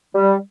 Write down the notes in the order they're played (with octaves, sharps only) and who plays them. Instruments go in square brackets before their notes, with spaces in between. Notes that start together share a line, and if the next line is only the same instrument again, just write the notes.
[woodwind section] G3